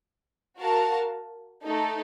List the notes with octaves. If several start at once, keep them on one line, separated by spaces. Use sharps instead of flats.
F#4 A#4 F5 A5
A3 D#4 A4